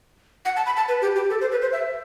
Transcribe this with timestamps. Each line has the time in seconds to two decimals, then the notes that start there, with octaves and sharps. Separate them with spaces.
0.45 F#5
0.56 A5
0.66 B5
0.76 A5
0.88 B4
1.02 G4
1.16 G4
1.30 A4
1.41 C5
1.51 B4
1.62 C5
1.72 E5